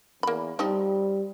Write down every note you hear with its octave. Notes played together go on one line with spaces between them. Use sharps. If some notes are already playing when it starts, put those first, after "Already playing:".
E2 A#3 B5
F3 G3 C4 D#4